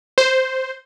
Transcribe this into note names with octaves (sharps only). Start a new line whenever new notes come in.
C5